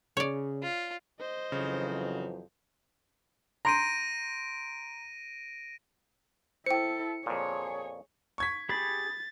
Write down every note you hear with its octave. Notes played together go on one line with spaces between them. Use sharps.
C#3 C#5 D5
F4
C5 D#5
F2 C#3 E3 F#3
A#5 C6 G6 A#6 D7 D#7
E4 A4 C5 G5 C#7
F2 A#2 G#4 C#5
C#6 G#6 B6
G4 G#4 B5 A6